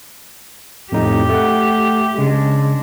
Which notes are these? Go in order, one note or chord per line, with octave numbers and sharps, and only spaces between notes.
F2 A2 D#4 G4
A3 F#5
C#3 G#3 D4